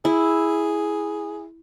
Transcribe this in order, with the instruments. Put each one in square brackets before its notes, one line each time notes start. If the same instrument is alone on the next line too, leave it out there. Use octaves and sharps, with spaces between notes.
[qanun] E4 [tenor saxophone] G#4